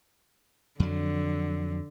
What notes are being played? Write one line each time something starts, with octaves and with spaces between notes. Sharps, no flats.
F2 D3 F#3